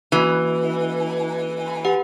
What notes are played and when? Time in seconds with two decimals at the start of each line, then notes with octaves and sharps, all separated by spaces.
0.12 E3 A#3 C#4 F#4
1.85 G4 B4 F#5